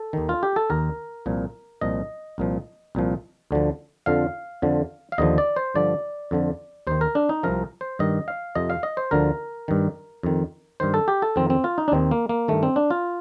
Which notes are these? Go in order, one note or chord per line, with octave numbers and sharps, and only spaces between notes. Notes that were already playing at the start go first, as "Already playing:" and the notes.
Already playing: A4
D#2 D#3
F4
G4
A4
D#2 D#3 A#4
C2 A#2 F3
C2 A#2 F3 D#5
C2 A#2 F3
C2 A#2 F3
D2 D3 F3
F2 D3 F3 F5
F2 D3 F3
F5
D#2 D3 F3 D#5
D5
C5
G2 D3 F3 D5
F2 D3 F3
D#2 D#3 C5
A#4
D4
D#4
C2 C3 F3 A#4
C5
G2 D#3 D#5
F5
F2 C3 F3 D#5
F5
D#5
C5
D2 D3 F3 A#4
G2 D#3
F2 D#3
G2 D#3 C5
A4
G4
A4
F2 D#3 C4
C4
F4
D#4
D4
D#2 D#3 C4
A#3
A#3
G2 D#3 A3
C4
D4
F4